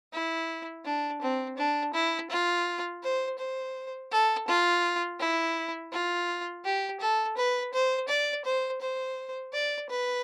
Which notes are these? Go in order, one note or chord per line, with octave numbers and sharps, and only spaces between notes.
E4
D4
C4
D4
E4
F4
C5
C5
A4
F4
E4
F4
G4
A4
B4
C5
D5
C5
C5
D5
B4